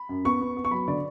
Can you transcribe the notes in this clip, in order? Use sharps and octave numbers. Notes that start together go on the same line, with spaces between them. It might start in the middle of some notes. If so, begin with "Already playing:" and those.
Already playing: B5
F#2
B3 C#6
B3
B3
C#6
F#3 B5
D3 D5